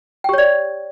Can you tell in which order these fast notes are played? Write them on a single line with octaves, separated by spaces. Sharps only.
G5 G4 C#5 D5